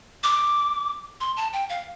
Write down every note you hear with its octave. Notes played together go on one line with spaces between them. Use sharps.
D6
C6
A5
G5
F5